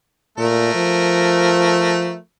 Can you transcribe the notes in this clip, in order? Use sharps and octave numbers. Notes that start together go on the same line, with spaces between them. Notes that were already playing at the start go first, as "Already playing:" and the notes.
A#2 A3 A#4
F3